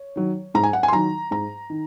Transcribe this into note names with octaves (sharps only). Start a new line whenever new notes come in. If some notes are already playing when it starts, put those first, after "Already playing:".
Already playing: C#5
D#3 F#3
G#2 A#5
G#5
F#5
G#5
C6
D#3 F#3 A#5
G#2 A#5
D#3